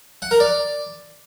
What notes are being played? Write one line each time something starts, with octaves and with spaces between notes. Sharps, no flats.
F#5
A#4
D5